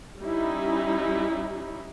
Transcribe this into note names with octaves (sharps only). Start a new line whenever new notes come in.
G3 C#4 D#4 E4